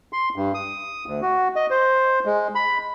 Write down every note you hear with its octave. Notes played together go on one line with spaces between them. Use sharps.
C6
G2
D#6
D2
F#4
D#5
C5
G#3
B5